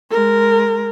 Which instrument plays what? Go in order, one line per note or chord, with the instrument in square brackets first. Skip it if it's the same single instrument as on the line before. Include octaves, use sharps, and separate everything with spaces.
[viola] G#3 A#4